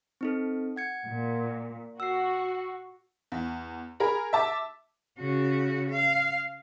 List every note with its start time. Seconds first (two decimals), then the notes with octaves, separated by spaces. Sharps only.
0.21 C4 D#4 A4
0.76 F#5 G#6 C#7
1.07 A#2
2.00 F#4 E6 C7
3.32 E2
4.00 G#4 A#4 A#5 B5
4.33 E5 A5 D6
5.19 C#3 F#4
5.90 F5